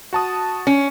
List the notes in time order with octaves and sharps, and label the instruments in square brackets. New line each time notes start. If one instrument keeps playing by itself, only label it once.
[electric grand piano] F#4 A5 D#6
[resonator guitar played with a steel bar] C#4